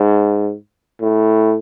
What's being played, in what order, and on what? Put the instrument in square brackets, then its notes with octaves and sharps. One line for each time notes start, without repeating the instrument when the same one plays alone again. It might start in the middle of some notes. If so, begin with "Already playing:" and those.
Already playing: [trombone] G#2
A2